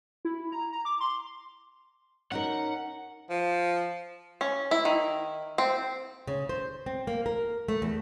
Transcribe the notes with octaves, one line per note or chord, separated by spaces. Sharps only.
E4
A#5
A#5
D6
C6
C#4 D#4 A#4 F#5
F3
C#4
E4
D#3
C4
C#3
C5
C4
A#3
A#4
A3
E2